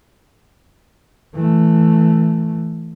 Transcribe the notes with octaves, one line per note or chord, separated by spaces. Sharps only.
E3 A3